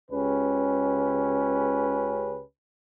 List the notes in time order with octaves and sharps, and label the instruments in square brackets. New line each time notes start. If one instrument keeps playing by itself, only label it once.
[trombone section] C#2 C#3 C#4 G4 B4